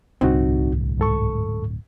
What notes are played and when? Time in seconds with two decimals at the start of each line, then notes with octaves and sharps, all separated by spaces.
0.21 D1 C2 G2 C4 D#4 F#4
0.99 G#2 A4 C#6